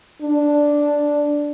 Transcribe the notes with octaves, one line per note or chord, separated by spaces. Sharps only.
D4